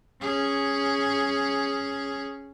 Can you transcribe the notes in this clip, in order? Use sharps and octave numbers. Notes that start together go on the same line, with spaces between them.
C#4 G#4